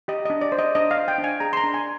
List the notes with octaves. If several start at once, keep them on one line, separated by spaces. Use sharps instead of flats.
G4 D#5
D4 D#5
D5
C5
D#5
D4 D#5
F5
C5
G5
D4
G#5
G#4 A#5
C6
A#5
D4
G#5